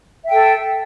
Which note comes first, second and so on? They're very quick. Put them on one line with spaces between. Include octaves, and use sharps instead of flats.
E5 G5 A4